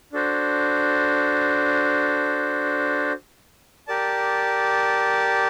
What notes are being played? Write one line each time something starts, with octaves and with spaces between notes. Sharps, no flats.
D4 F#4 A4 C5
G4 A#4 D5 A5